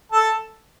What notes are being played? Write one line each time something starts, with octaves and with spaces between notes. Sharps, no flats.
A4